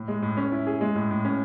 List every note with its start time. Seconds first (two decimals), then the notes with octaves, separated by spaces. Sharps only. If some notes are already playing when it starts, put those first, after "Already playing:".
Already playing: A2
0.08 G#3
0.22 A2
0.37 C#4
0.52 E4
0.67 G#4
0.81 G#3
0.95 A2
1.11 A2
1.25 C#4